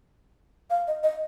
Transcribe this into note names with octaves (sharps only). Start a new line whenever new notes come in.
F5
D#5
D#5